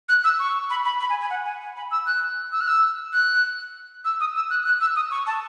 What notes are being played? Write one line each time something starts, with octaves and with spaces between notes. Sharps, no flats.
F#6
E6
C#6
B5
B5
B5
G#5
G#5
F#5
G#5
G#5
B5
E6
F#6
E6
F#6
E6
F#6
E6
D#6
E6
F#6
F#6
E6
D#6
C#6
A5